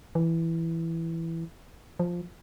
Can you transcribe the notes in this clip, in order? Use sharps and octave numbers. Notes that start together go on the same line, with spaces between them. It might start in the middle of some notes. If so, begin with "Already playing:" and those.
E3
F3